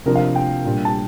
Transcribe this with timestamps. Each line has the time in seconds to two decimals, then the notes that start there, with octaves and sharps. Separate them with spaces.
0.05 C3 F3 A#3 D4 A#4
0.16 F5
0.35 G5
0.65 A#2 G3 D4
0.85 A5